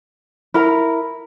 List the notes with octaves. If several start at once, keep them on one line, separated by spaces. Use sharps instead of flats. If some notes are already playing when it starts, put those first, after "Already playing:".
E4 A#4 A#5